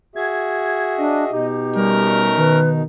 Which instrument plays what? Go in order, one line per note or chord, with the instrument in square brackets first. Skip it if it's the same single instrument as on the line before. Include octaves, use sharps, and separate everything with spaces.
[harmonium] F#4 G#4 E5 [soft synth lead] G#6
[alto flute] D4 [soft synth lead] D#5
[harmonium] B2 D#4 [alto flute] G4
[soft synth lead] G3 [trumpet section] A3 C#4 A#4
[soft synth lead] D#3 [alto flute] B4